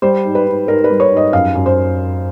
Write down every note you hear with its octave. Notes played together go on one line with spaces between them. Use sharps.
G3 C5
G#2
B4
G#2
G#2 A#4
B4
G3
C#5
G#2 D#5
F#2 F5
F#2
C5